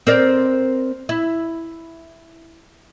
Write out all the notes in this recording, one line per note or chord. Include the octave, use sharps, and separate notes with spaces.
C4 A#4 D5
E4